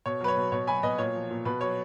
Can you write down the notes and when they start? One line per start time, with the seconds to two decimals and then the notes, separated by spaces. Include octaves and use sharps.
0.06 B2 C#5
0.21 F#3 B4
0.28 C#5
0.37 B2
0.52 B2 C#5
0.67 F#3 G#5 B5
0.83 B2 B4 D#5
0.98 A#2 C#5
1.14 F3
1.30 A#2
1.45 B2 B4
1.61 F#3 C#5